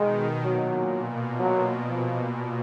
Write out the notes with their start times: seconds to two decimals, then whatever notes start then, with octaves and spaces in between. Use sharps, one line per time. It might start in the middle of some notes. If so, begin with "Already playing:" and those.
Already playing: B2 D#3 G#3
0.43 A#2 F#3
0.91 B2
1.40 F#3
1.88 F3